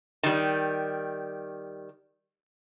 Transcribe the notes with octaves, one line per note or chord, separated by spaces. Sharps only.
D#3 G3